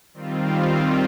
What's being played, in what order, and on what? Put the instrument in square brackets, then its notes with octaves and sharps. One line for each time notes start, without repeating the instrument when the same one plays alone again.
[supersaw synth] D#3 G3 C4 F4